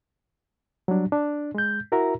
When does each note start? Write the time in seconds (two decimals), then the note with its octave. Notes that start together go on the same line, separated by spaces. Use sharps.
0.88 F#3 G3 D4
1.12 D4
1.55 G#3 G6
1.92 E4 F#4 A#4 E5 A#5